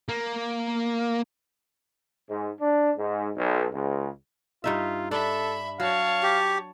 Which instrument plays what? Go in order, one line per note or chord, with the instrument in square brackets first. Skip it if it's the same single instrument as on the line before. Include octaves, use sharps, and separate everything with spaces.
[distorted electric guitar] A#3
[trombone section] G#2
D4
G#2
B1
C#2
[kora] G2 D#4 E5 [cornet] F4
[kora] D4 [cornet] A4 [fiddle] E5 B5
[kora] F#3 [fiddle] C#5 A5 [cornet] F5
[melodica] G4